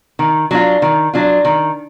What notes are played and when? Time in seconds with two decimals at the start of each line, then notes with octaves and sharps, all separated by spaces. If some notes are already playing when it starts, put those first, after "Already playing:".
0.19 D#3
0.51 F#3 D4 F4
0.82 D#3
1.13 F#3 D4 F4
1.45 D#3